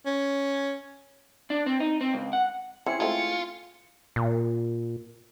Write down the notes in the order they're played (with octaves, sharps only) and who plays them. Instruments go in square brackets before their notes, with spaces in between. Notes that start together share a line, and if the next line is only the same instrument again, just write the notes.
[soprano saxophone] C#4
[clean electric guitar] D4
C4
D#4
C4
C#2
F#5
[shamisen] E3 C4 [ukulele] C#4 E4 G#4 [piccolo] C#7
[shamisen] G#3 A3 C4 [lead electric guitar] F4
[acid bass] A#2